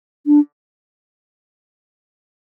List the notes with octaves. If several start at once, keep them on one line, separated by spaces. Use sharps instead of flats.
D4